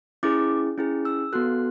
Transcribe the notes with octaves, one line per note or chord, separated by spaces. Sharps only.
C#4 E4 G#4 D6
C#4 E4 G#4
E6
B3 F#4 A4 F#6